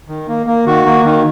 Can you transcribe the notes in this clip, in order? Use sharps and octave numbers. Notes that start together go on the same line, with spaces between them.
D#3
A#3
A#3
D#3 F#4
A#3
D#3